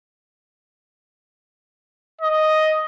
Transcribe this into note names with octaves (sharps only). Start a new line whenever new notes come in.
D#5